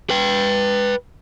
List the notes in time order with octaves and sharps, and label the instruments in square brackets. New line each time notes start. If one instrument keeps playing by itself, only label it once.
[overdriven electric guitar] B4 G5